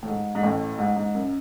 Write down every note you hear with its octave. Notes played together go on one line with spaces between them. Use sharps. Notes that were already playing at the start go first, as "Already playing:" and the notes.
A2
G#2
G#2
A1 A2
G#2
G#2
F#2